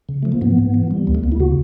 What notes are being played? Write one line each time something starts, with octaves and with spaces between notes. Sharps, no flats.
C#3
F3 A3
A#3
G#2 B3
G#2
E3
G3
D2 B3
A3
D2 A#3
E4
C#3 F#4